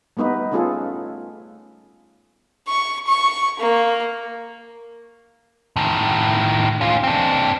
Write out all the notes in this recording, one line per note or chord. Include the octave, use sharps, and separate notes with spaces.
G3 A3 B3 D#4 B4
A3 B3 C#4 F4 G#4 A4
C#6
C#6
A#3
A2 D#3
C#4 F4
C4 D4